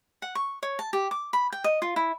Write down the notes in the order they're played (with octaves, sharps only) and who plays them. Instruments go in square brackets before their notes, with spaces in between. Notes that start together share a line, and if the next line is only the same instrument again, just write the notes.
[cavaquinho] F#5
C#6
C#5
A5
G4
D6
B5
G5
D#5
F4
E4